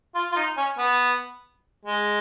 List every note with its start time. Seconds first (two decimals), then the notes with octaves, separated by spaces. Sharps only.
0.15 F4
0.32 F4
0.36 D#4
0.57 C#4
0.78 B3
1.85 G#3